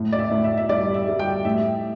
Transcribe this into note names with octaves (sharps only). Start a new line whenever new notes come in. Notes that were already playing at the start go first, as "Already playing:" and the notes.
Already playing: A2
D5
E5
A2
E5
E5
G3 D5
E5
G3
G5
A2 E5